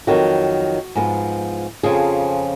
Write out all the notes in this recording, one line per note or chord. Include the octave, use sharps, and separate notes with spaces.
F2 D#3 F#3 F#4
G#2 F3 B3
F2 C#3 F3 G#4